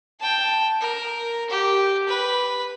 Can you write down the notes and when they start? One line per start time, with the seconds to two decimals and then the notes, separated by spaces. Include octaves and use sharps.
0.20 G5 A5
0.81 A#4
1.50 G4
2.08 B4